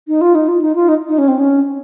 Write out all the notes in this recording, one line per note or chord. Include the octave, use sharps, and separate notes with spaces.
D#4
F4
D#4
F4
D#4
F4
D#4
D#4
C#4
C4
C#4